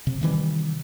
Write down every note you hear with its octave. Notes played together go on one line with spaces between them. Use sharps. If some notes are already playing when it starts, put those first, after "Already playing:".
C3
C3 D#3 E3 G3